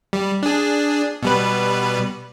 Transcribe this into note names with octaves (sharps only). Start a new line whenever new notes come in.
G3
D4 G#4
B2 G3 B4